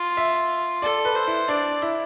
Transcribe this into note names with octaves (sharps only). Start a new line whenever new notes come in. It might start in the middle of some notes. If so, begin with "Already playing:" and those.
Already playing: F4
E5
A4 D5
B4
C5
E4
D4 D5
E4